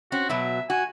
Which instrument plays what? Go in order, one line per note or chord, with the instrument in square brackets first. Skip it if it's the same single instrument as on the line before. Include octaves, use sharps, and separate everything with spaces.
[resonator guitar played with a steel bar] C4 C#4 [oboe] F#4
[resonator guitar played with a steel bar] B2 F#3 [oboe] E5
[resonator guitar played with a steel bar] F#4 [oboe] G#5